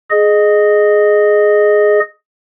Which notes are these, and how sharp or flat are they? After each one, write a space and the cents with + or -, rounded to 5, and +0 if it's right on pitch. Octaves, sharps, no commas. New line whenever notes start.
G#4 +10 D#5 -15